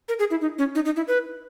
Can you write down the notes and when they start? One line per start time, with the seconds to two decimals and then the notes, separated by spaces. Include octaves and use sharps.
0.09 A#4
0.19 G#4
0.31 E4
0.41 D#4
0.58 C#4
0.75 D#4
0.85 D#4
0.96 E4
1.08 B4